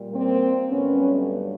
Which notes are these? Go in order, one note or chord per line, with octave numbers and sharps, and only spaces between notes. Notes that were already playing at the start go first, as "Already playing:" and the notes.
Already playing: A#2 G3
A#3 C4
G2 D3 F#3 A3 B3 C#4